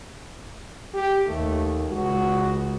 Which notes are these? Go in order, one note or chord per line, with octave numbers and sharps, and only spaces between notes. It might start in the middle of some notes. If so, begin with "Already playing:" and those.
G4
D#2 A3
C#2 F#4